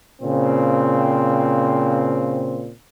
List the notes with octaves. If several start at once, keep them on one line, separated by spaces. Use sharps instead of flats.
A#2 C#3 C4